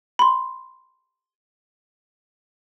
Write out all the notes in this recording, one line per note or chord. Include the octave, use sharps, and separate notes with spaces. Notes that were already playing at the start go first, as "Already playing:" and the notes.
B5 C6